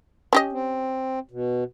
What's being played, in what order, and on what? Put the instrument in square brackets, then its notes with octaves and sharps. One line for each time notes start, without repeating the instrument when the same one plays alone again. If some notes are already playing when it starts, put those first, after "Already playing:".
[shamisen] C#4 G4 D#5
[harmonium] C4
B2